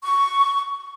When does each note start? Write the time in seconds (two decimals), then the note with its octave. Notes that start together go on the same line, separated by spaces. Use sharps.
0.03 C#6